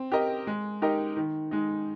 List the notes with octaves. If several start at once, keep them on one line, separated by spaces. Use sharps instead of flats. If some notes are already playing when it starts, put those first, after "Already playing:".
Already playing: C4
G4 A#4 D#5
G#3
D#4 G4 A#4 D#5
D#3
G#3 D#4